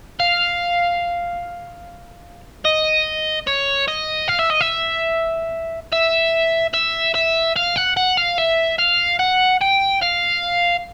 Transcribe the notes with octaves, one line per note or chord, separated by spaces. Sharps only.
F5
D#5
C#5
D#5
F5
E5
D#5
E5
E5
E5
E5
F5
F#5
F#5
F5
E5
F5
F#5
G5
F5